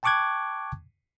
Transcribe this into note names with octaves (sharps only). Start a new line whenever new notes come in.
G5 A5 C#6 D6 F#6 G#6